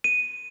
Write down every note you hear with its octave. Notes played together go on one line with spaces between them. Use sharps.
D#7